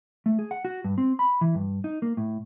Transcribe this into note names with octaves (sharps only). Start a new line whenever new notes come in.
A3
G#4
F#5
F#4
G2
C4
B5
E3
G2
D#4
A#3
A2